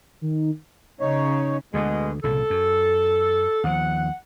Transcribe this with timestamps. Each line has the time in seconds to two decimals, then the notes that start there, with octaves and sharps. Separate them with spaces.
0.21 D#3
1.00 C#3 D#4 C#5
1.74 D2 B2 D3 G#3
2.24 C2 A#2 C#3 A4
2.50 F#2
3.64 D#2 F3 F#5